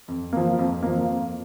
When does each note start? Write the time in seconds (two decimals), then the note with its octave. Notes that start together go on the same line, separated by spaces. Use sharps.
0.08 F2
0.33 F3 A#3
0.59 F2
0.83 F3 A#3
1.08 F2